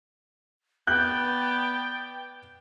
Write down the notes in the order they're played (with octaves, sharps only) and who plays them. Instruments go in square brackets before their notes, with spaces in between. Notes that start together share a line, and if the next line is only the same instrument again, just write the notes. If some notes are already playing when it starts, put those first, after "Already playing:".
[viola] B3 D5 [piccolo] G5 [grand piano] F#6 G6